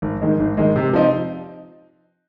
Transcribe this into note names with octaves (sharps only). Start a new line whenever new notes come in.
G#1
G#2 D#3 G#3
G#1
G#2 D#3 G#3
C3
F3 C4 D#4